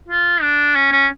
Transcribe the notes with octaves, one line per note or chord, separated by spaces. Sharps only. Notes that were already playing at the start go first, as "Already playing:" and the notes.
F4
D4
C#4
C#4